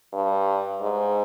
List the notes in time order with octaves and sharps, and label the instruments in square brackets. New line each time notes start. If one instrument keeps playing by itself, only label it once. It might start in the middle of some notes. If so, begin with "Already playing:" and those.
[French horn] G2
G#2